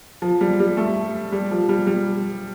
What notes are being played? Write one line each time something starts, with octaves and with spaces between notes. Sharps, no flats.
F3
G3
G3
A3
G3
F3
G3
G3